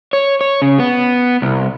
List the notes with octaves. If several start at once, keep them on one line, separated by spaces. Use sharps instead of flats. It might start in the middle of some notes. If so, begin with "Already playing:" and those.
C#5
C#5
C#3
B3
C2